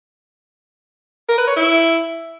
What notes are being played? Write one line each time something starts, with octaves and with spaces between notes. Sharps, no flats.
A#4
B4
C#5
E4